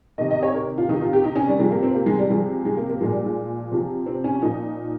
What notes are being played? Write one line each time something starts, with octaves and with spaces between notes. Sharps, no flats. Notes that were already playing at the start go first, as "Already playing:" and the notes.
C3 D#3 D#5
D#5
C#5
A#4
F4
C3 D#3 D#4
F4
G4
D#4
C#4
G3
C3 F3 G#3
A#3
C4
A#3
G#3
G3
C3 F3 G#3
G#3
A#3
A#3
A#2 F3 G#3
G3
G#3
C3 F3
C4
C#4
A#2 F3 D#4